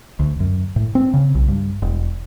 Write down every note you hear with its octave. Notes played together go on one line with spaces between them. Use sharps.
D2
F#2
A2
C4
C#3
B1
G2
E1